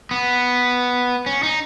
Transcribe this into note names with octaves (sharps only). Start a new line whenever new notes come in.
B3
C#4
D#4